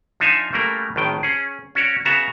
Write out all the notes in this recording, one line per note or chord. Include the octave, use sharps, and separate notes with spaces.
F3 D4 D#4 E5 F5 G#5
C#3 G3 A3 A#3 A#4
G#1 A2 D#3 G5
C#4 G#4
C#4 F#4 C#5 D5
C#3 B3 F#4 E5 A#5